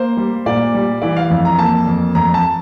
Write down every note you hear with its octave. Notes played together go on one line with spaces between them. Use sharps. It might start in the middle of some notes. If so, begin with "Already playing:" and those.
Already playing: A#3 C5
G3
A#2 D5
G3
E3 D5
F5
F2
A#5
A#3 A5
F2
F2 A#5
A5